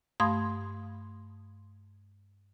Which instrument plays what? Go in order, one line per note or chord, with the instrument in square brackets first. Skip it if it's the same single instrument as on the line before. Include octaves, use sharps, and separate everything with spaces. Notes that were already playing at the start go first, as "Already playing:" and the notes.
[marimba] G2 A3 F5 C6 D#6 G#6